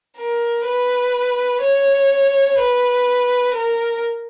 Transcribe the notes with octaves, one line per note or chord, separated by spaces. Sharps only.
A#4
B4
C#5
B4
A#4